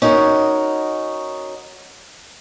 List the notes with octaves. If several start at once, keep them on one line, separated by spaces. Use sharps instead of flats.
C#4 D#4 F#4 A#4 D#5